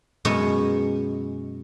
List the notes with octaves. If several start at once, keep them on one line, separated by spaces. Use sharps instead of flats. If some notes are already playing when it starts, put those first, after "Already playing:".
F#2 B2 G#3 C#4 C#5